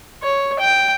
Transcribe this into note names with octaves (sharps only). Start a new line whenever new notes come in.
C#5
G5